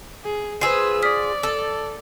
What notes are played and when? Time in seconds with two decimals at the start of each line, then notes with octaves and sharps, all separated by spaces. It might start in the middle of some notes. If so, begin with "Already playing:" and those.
0.24 G#4
0.61 F4 G#4 B4 C5 E6 C7
1.02 D5 D#6 F6 B6
1.43 A4